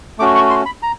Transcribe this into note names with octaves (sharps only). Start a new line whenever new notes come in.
A3 C#4 F#4 D6
C#6
C6
B5
A#5